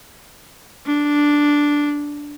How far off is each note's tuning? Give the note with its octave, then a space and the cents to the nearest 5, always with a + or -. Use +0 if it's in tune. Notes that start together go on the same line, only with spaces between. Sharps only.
D4 -5